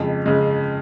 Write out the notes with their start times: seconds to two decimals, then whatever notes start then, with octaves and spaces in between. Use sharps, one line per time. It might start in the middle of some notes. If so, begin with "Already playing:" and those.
Already playing: F2 C#3 G#3
0.26 C#3 G#3